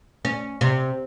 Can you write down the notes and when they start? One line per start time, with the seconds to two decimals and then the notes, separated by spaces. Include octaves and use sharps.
0.25 C#4
0.61 C3